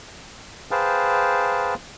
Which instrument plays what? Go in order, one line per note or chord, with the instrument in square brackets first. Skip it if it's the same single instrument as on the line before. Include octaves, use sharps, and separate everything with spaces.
[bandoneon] G#4 B4 C5 F5 G5 A5